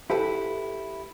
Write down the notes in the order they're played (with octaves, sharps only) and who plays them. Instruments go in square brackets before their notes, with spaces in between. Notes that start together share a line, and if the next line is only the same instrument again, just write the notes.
[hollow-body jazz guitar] E4 G4 A4 B4